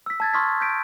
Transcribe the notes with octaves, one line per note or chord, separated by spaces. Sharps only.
E6 B6
A5 G#6 A6
C6 C#6 D#6 F6 G#6 B6
G6 B6 D7